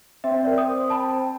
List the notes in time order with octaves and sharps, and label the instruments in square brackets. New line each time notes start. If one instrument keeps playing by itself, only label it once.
[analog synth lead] C4 [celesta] E5
[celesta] A#4 D5
D#6
A5 B5